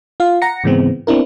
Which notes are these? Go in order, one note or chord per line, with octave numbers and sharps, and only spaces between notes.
F4 F5
F#5 A#5 A#6 C#7
G#2 C#3 E3 G#3 B3 C4
B3 C4 D4 E4 A#4